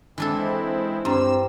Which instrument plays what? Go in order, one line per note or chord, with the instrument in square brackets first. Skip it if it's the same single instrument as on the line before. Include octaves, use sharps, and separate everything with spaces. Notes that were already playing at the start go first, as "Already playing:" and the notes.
[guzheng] E3 D4 A4 [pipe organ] G#3 C4 E4
[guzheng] G2 [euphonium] C4 [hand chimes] A#5 C6 [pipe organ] E6